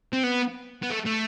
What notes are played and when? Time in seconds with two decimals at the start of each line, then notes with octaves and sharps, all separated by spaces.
0.13 C4
0.23 B3
0.82 B3
0.90 A3
1.05 A3